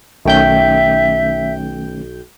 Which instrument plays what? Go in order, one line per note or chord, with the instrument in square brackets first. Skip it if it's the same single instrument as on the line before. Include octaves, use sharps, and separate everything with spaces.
[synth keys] B1 G5 G6 [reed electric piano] D#3 A3 C#4 [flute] E5